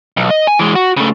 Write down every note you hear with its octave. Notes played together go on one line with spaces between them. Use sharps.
B1
D#5
G#5
E3 G#3
F#4
C#3 A3